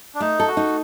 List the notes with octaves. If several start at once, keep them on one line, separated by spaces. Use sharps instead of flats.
D4
A3 D#4
A4
F#4
D#4